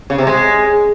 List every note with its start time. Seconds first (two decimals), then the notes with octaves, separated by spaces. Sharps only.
0.10 C#3
0.18 C3
0.27 G#3